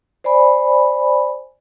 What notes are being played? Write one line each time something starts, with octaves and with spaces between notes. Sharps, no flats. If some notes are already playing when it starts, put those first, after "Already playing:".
C5 D5 G#5 B5